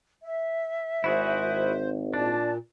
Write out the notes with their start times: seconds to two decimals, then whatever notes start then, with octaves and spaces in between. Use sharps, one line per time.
0.23 E5
1.04 G#1 E4 F#4 G#4 C5
2.14 A#2 D4 D5 A5